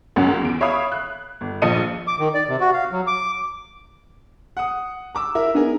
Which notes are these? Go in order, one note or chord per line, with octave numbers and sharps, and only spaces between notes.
C#2 F#2 C#4 F#5
E2 D7
C#5 E5 F5 B5 D#6
F#6
G1
A#1 F3 D#5 C#7 D#7
D6
D#3
D5
C3
F#4
F5
F#3
D6
F#5 D#6
A#5 D6 E6
E4 A#4 E5
B3 D4 D#4 G#4 A#4